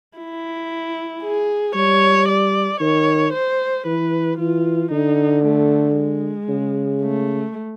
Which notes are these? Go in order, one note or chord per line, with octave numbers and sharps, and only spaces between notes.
E4
G#4
G3 C#5
D5
D#3 C#5
C5
E3 B4
E3 F4
D3 D#4
A3
G#3
C#3
A3